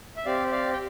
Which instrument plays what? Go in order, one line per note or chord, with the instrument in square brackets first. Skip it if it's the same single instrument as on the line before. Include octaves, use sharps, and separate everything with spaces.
[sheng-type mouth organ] E5
C4 G4 D5 F5
D5 F5
G5